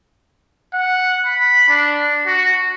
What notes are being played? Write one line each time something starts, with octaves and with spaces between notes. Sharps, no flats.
F#5
B5
D4
F#4